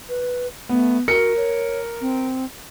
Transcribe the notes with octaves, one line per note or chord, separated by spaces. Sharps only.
B4
A3 B3
F#4 A#4 C#7
C#5
C4